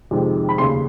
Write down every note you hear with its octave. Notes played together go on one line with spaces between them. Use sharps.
F2 C3 D#3 G#3
B5
F1 D#2 C#3 C6